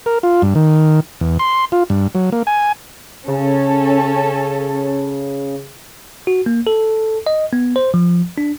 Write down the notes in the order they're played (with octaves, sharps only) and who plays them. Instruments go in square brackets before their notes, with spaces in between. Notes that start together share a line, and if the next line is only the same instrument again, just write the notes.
[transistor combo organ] A#4
F4
G2
D#3
E2
C6
F4
G2
F#3
A#3
G#5
[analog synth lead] C#3 [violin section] C#4 A4
[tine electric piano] F#4
A#3
A4
D#5
B3
C5
F3
D4